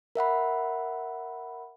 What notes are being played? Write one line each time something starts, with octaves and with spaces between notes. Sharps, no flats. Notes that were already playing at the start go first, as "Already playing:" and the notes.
A#4 E5 F#5 B5